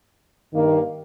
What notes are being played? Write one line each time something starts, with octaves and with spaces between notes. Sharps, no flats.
G2 D#3 A#3